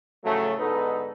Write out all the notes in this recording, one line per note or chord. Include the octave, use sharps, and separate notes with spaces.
A2 C#3 F3 F#3 A3
G#2 D3 B3 D#4 A4 B4